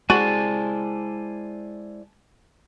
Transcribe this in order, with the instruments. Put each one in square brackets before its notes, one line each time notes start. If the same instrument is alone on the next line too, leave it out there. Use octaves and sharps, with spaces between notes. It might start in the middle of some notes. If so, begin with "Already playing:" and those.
[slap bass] G#3 [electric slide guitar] E4 C5 D5 [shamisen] F#4 [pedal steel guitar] G#5 A5